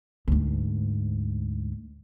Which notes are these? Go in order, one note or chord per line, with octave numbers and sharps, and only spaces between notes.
D2 G#2